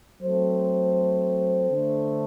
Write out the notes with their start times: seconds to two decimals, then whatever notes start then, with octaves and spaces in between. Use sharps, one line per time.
0.21 F#3 A3 C4 A4 C5
1.71 D3 A3 D4